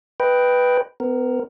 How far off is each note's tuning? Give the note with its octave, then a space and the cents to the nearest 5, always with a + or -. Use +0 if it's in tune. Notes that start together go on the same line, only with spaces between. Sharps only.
B4 +0 D#5 +15 G5 +0
B3 +35 A#4 +0